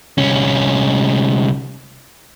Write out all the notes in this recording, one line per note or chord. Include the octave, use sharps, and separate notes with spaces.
C2 C#4